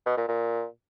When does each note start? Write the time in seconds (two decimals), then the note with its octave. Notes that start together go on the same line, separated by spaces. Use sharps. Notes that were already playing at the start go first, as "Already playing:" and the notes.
0.06 B2
0.17 A#2
0.28 A#2